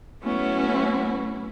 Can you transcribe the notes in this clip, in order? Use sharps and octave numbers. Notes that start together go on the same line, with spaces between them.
F#3 A3 B3 C#4 E4 F#4